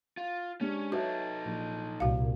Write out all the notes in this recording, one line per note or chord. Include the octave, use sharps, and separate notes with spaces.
F4
G#3 C#4 D4 G4
D#4 F#4 A4 B4 C#5 E5
A#1
C2 A#2 F#4 F5